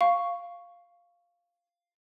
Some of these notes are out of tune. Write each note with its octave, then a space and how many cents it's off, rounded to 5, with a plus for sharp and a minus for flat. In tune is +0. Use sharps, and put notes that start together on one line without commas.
F5 +0 C#6 +0